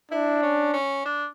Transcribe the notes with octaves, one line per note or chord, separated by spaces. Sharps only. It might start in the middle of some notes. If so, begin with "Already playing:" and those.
D4 E4
C#4
C#4
D4